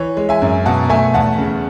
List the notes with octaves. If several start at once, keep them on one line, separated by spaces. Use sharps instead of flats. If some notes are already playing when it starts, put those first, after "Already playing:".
Already playing: E3 C#5
G#3
E5 G#5
F#2
B2 F#5 A5
A3 E5 G#5
E2 F#5 A5
C#3